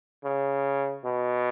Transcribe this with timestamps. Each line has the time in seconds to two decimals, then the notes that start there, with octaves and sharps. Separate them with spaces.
0.24 C#3
1.05 B2